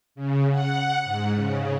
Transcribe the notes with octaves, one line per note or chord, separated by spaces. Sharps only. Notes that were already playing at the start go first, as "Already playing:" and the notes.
C#3
F#5
G#2
C#3